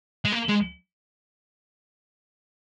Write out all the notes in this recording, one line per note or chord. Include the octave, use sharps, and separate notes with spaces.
G#3
A#3
G#3